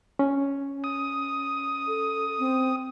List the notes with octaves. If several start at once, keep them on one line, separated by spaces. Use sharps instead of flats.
C#4
D#6
A4
C4